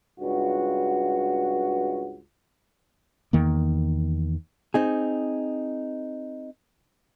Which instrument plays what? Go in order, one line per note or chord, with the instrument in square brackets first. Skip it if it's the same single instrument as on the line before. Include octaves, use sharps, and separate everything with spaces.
[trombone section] C#2 G2 F#4
[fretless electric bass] E2 D#3 A#3
[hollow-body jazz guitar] C4 D#4 G#4